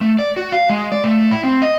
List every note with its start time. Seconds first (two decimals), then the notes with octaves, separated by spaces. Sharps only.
0.01 A3
0.19 D5
0.36 F#4
0.52 F5
0.69 G#3
0.92 D5
1.04 A3
1.31 E4
1.43 C4
1.62 D#5